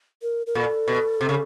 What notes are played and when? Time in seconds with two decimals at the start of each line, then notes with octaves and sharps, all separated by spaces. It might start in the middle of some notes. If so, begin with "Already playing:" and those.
0.22 A#4
0.47 A#4
0.55 A#2 A4
0.88 B2
1.21 C3
1.29 C#3